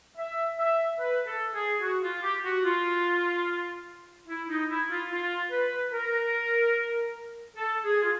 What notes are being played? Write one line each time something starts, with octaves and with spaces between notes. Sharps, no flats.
E5
E5
B4
A4
G#4
F#4
F4
G4
F#4
F4
E4
D#4
E4
F4
F4
B4
A#4
A4
G#4
F4